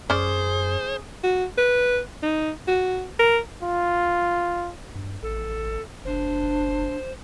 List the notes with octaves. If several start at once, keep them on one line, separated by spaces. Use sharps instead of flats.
F#2 C#4 G#4 C5 D5
F#4
B4
D#4
F#4
A#4
F4
G2
A1 A4
F#1 D4 C5